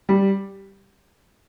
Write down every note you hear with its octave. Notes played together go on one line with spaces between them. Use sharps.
G3